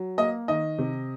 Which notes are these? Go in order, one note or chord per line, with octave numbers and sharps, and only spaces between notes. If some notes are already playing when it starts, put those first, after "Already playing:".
Already playing: F#3
A#3 D#5
D#3 D#5
C3